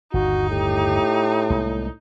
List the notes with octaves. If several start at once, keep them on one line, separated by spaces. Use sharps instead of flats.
G1 D#2 D#4 F#4
A2 G4
C2 G#3 A#3